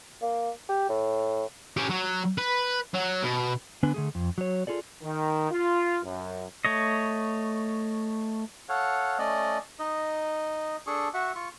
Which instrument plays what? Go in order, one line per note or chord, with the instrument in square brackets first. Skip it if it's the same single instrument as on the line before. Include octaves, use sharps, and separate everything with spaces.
[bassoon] A#3
G4
A2
[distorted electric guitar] C#4 G4
F#3
B4
F#3
B2
[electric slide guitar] D3 B3 D4 B4 G#5
D3 A3 G#4
F2
F#3 C#5
F4 G#4 A4 D5
[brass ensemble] D#3
F4
F#2
[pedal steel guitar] A3 C#5 D#5
[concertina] A4 C#5 F5 F#5
A3 C#4 D5 D#5
D#4 D#5
D4 G#4 A4 C#6
F#4 E5 F#5 C#6
F4 C#6